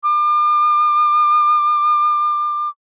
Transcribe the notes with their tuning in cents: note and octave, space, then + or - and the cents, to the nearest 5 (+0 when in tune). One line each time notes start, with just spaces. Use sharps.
D6 +40